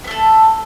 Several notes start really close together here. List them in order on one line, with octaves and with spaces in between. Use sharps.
B3 A3 A4